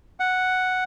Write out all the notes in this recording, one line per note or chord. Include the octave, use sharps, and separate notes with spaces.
F#5